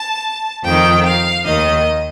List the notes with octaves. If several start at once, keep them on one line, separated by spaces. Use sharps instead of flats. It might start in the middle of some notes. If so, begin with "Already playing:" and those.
Already playing: A5
F2 D#3 G5
F5
D#2 D#3 D#5